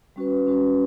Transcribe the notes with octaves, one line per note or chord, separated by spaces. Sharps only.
G3 C#4 F#4 B4
G3 C#4 F#4 B4